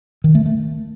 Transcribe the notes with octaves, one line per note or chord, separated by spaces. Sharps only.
D#3
A3
A3